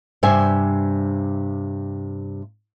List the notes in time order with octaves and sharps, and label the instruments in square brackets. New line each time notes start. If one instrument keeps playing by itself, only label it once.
[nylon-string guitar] G2 C3 C5 E5 G#5